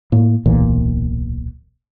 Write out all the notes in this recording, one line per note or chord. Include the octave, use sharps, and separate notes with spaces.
A2 A#3
D1 B1 A#2 E3